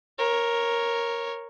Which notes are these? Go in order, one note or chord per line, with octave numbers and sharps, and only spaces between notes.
A#4 C#5